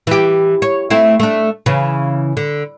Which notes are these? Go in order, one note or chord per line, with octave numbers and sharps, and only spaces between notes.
E3 G4
C#5
A3 C4 E4
A3 D4
C#3 E3
D3